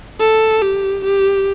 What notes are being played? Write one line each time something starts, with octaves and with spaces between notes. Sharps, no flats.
A4
G4
G4